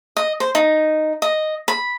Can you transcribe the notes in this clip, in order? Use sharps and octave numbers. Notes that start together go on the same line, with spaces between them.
D#5
C5
D#4
D#5
B5